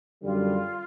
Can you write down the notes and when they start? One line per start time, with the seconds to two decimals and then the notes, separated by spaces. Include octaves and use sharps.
0.22 F#2 D3 G3 F4